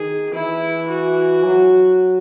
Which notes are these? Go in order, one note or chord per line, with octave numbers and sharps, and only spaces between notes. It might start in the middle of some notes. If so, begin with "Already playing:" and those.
Already playing: D#3 G#4
E3 E4
F#4
F#3